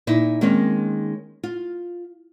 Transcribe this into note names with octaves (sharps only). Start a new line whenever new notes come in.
A#2 D#4 E4
D#3 G#3 A#3 C4 C#4
F4